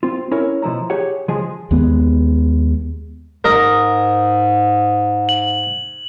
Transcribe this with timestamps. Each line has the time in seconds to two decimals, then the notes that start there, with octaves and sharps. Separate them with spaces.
0.03 C4 F4
0.31 C#4 E4 A#4 C#5
0.62 B2 F3 E4 A#5
0.90 G4 G#4 C#5 F#5
1.28 C#2 F3 G#3 G#4
1.71 D#2 G#3 B3
3.44 G#2 A#4 D#5
5.29 F#7